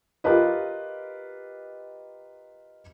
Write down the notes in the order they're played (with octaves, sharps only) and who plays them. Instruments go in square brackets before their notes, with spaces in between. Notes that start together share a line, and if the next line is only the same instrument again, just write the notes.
[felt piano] F4 G4 A#4 B4 D#5